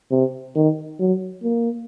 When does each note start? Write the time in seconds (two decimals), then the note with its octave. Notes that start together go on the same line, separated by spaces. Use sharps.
0.11 C3
0.55 D#3
0.99 F#3
1.43 A#3